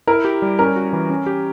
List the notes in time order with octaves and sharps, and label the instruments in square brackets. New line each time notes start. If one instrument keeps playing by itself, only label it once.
[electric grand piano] E4 [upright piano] A#4
[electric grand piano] G4
G3
[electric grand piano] C#4 [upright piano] A#4
[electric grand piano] F#4
E3
C#4
G4